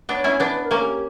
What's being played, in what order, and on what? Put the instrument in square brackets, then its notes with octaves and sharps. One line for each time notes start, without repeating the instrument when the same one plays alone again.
[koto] B3 D4 [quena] C#5
[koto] C#4 E4
[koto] B3 D4 [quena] B4
[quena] B4
A#4
[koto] A#3 C#4
[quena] G4